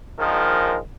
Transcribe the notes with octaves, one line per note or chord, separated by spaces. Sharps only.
A#1 D#3 F3 G#3 A#4